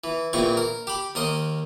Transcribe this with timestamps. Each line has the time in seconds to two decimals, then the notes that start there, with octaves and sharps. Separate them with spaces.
0.04 E3
0.33 A#1 A#2 E3 C4 C#6
0.57 A#4
0.87 G4 B5
1.15 D#2 A#4 D#5 C6